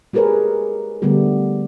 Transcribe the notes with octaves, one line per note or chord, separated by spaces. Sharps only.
G#3 G4 G#4 A#4 B4 C#5
D3 G3 A3 B3 G4